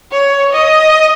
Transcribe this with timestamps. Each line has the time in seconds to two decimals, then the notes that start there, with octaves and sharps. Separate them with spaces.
0.12 C#5
0.53 D#5